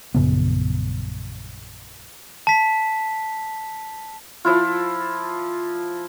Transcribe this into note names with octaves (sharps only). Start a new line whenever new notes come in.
A#1 F#2 C#3 B3
A5 B6
F3 E4 F4